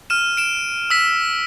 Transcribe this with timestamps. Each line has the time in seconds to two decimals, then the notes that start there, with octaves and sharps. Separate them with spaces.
0.10 F6 D#7 E7
0.37 D7 E7
0.90 E6 B6